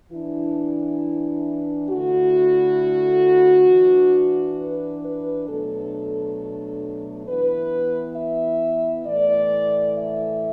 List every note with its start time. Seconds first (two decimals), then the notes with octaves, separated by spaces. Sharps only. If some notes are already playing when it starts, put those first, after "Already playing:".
0.11 E3 D4 E4
1.90 D3 A3 E4 F#4
3.69 E3 D4
4.58 B4
5.03 B4
5.48 B2 F#3 A3 D4 A4
7.27 E3 B3 E4 B4
8.16 E5
9.06 A2 E3 A3 D5
9.96 E5